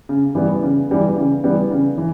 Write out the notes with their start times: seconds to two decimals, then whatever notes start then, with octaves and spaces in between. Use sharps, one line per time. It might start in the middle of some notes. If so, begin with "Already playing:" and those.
0.09 C#3
0.35 E3 G3 B3
0.63 C#3
0.90 E3 G3 B3
1.17 C#3
1.44 E3 G3 B3
1.71 C#3
1.98 E3